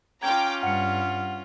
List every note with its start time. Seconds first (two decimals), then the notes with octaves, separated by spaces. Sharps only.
0.23 C#4 F4 G5 A#5 D6 G#6
0.63 G2 F#5 C#7